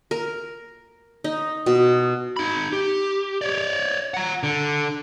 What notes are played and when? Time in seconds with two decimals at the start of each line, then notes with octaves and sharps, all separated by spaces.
0.11 A#4
1.24 D#4
1.66 B2
2.37 D#4 B5
2.73 G4
3.41 C#5 D5
4.14 F#5 A#5
4.43 D3